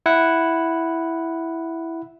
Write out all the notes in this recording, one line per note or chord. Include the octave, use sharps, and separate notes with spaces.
E4 F#5